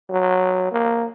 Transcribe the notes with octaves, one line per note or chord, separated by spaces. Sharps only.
F#3
A#3